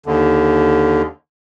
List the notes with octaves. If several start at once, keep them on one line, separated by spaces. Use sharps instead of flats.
D#2 D3